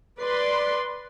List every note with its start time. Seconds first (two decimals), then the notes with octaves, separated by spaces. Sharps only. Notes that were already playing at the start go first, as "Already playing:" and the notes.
0.19 B4 D5 C6